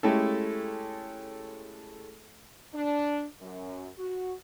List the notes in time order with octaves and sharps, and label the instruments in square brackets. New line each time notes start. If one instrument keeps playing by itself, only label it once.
[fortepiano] G#3 A3 C#4 E4 G4 A4
[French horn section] D4
F#2
F#4